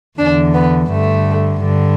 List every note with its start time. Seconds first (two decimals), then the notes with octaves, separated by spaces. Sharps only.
0.18 E2 D3 D4
0.54 B3
0.91 G2 D3 A3
1.63 G2 D3